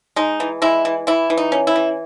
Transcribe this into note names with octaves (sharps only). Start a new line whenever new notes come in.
G#3 D#4
E3
G#3 E4
E3
E3 E4
E3
D#4
C#4
E4
E3